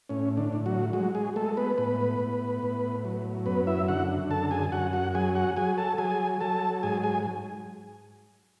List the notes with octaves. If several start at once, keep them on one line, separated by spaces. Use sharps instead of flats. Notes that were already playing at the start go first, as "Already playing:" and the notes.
A2 C#4
D3 D4
A2
F#3 F#4
F#3 G#3 F#4
G#3 G#4
G#3 A3 A4
B3 B4
A2 B3 B4
A2
A2
F#3
F#2 B3 B4
E4 E5
D3 F#4 F#5
F#2 A4 A5
G#4 G#5
F#2 F#4 F#5
F#4 F#5
F#3 G#4 G#5
F#4 F#5
F#3 G#4 G#5
A4 A5
F#3 G#4 G#5
F#3 A4 A5
G#2 G#4 G#5
G#4 G#5